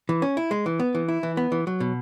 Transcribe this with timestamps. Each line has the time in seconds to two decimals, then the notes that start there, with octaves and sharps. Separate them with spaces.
0.09 E3
0.22 C#4
0.37 E4
0.51 G#3
0.66 E3
0.80 B3
0.95 E3
1.08 E4
1.23 E3
1.37 B3
1.52 E3
1.67 F#3
1.80 B2